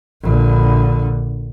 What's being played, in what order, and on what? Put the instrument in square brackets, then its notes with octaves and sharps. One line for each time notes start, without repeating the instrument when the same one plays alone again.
[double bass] A#1 D3